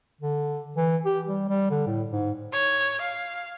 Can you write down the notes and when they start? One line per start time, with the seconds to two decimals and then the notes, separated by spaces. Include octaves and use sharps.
0.21 D3
0.77 E3
1.05 G4
1.26 G3
1.49 G3
1.71 D3
1.87 A2
2.11 G#2
2.53 C#5
3.01 F5